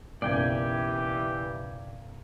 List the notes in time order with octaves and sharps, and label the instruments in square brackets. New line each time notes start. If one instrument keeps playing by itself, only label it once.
[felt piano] F#1 B1 [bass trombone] E3 [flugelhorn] G4 [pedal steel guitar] D5 G5 G#5